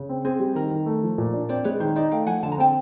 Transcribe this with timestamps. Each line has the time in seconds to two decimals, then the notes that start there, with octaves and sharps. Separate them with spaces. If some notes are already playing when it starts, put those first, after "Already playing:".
Already playing: C#3
0.09 C4
0.25 C4 G#4
0.40 G3
0.55 D#3 A#4
0.71 D#3
0.86 A3
1.03 F3
1.18 A#2
1.33 D4
1.49 C4 C5 D5
1.64 G#3 B4 C#5
1.80 D#3 C5
1.96 D#4 C5 D5
2.12 A3 F5 G5
2.26 F3 F#5 G#5
2.43 D3 A5
2.52 A#5
2.58 C4 G5 A5